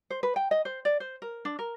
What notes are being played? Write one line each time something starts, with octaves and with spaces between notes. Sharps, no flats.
C5
B4
G5
D#5
C5
D5
C5
A#4
D4
A#4